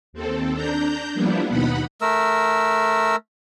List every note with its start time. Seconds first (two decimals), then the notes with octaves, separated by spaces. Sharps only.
0.13 D#2 C4 A4
0.53 D4 A#5 G6
1.14 F3 G3 A#3 B3 D4 E4
1.49 D#2 B2 D#4 F#5 B5
2.01 A3 A#4 E6